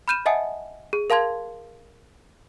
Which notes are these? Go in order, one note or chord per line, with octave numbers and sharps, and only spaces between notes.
B5 F6 G6 D#7 E7
D#5 E5 F#5 G#5 A5 D#6
G#4
A#4 F5 A5 C6 G#6